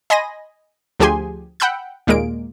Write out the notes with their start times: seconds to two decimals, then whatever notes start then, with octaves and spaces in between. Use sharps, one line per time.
0.10 D#5 G#5 B5 C6 A#6 D#7
1.00 D2 F3 G4 G#4 G#5 C6
1.60 F#5 G5 B5 E6 F#6 G6
2.07 D#2 A#2 G#3 A#3 D7